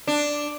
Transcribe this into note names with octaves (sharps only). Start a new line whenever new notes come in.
D4